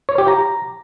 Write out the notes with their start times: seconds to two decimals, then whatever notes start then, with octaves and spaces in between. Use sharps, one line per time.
0.09 C#5
0.18 G4
0.28 A#5